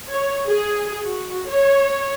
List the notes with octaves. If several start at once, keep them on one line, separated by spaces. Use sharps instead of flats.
C#5
G#4
F#4
C#5